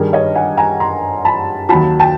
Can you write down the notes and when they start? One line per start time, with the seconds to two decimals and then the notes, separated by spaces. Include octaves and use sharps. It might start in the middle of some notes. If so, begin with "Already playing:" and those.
Already playing: G2 D#3 G3 G#4 A#4
0.13 C#5 D#5
0.35 F#5 G#5
0.57 G#5 A#5
0.80 A#5 C6
1.25 A5 B5
1.69 D#2 D#3 F#3 A5 B5
1.99 G5 A5